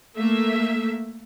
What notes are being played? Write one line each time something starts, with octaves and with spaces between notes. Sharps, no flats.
A3 A#3 E5